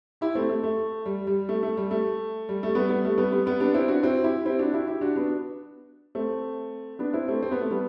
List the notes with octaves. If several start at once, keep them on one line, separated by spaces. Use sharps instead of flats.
E4 G4
A3 C4
A3
A3
G3
G3
A3
A3
G3
A3
G3
A3
G3 B3
G3 B3
A3
G3 B3
G3 B3
G3 B3
B3 D4
C4 E4
D4 F#4
C4 E4
E4 G4
C4 E4
D4 F#4
E4 G4
E4 G4
D4 F#4
B3 D4
A3 C4
B3 D4
C4 E4
A3 C4
C4
B3
A3
G3 B3